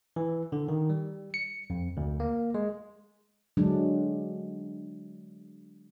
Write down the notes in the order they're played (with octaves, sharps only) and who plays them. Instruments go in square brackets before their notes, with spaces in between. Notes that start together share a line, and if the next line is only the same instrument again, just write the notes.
[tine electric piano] E3
D3
D#3
G3
C#7
F2
D2
A#3
G#3
[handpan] D3 F#3 G#3 D4